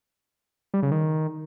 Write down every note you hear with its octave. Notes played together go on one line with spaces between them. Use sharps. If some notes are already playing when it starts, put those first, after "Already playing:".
G3
C#3
D#3